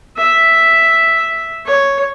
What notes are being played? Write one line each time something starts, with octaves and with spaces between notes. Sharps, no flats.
E5
C#5